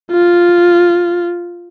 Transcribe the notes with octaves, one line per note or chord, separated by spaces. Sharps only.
F4